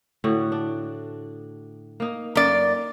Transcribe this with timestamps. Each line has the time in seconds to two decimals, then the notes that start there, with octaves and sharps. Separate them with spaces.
0.24 A2 D3 F#4
0.52 D4
2.00 A#3 D#4
2.35 F#2 A#3 D5